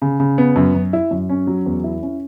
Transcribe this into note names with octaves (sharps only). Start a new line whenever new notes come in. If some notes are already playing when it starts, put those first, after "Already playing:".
C#3
C#3
B3
F#2
F#2
E4
F#2
C#4
F#3
E2
E4
C#4